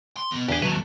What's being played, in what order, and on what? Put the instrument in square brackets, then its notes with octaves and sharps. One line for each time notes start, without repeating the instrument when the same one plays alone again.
[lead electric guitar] C6
E2 B2
[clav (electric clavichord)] E2 G#4 [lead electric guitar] D4 [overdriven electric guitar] G4
[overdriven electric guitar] D#2 F#3 [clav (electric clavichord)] B4 [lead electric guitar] E5 A5